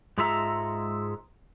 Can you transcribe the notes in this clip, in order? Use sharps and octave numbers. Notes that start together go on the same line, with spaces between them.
G#2 G#3 F4 A4 E5 A#5